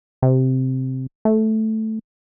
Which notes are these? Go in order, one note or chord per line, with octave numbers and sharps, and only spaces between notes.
C3
A3